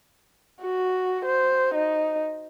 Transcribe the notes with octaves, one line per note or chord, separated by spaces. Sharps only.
F#4
C5
D#4